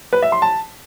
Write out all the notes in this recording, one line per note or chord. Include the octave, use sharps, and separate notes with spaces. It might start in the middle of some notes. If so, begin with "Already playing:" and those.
B4
E5
C6
A5